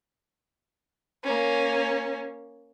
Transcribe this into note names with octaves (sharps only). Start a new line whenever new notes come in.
A#3 C#4